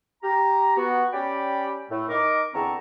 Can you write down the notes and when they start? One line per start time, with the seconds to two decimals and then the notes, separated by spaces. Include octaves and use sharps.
0.23 G4 A#5
0.77 B3 F#4
1.13 C#4 G4 D5 G5 B5
1.90 A2 A3
2.09 D#4 A#4 D6
2.54 E2 D3 C4 A5 A#5 C#6